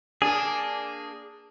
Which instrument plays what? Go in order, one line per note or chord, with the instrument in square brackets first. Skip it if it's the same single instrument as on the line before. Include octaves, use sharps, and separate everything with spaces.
[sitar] A#3 D4 [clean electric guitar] G#4